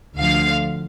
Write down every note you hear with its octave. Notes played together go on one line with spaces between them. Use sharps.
D2 D3 F3 F5